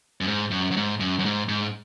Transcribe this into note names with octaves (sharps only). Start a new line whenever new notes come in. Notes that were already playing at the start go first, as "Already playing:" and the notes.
F#2
G#2
F#2
F#2
G#2
F#2
F#2
G#2
G#2